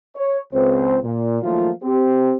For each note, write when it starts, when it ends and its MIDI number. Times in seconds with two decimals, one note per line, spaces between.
0.16 0.39 73
0.53 0.98 37
0.53 0.98 60
0.53 0.98 72
1.03 1.39 46
1.42 1.70 51
1.42 1.70 53
1.42 1.70 54
1.42 1.70 57
1.42 1.70 58
1.42 1.70 65
1.83 2.36 60
1.83 2.36 67